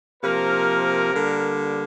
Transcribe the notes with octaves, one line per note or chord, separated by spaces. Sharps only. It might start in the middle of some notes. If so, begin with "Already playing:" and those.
C3 F3 A#3 A#4
D3 G3 A#3